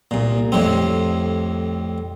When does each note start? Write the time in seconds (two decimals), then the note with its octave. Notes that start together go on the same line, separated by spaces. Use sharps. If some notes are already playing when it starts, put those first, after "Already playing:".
0.11 C2 A#2
0.52 F2 A2 G3 C4